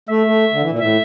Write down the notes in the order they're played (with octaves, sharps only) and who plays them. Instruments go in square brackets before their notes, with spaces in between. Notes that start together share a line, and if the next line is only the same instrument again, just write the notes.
[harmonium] A3 [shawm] E5
[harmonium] A3
D3
E3
A#2
[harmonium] A2 [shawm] E5